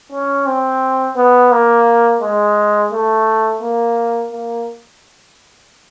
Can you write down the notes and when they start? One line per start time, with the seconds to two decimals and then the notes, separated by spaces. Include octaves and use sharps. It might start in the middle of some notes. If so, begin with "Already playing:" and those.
0.11 C#4
0.46 C4
1.16 B3
1.51 A#3
2.21 G#3
2.92 A3
3.62 A#3
4.32 A#3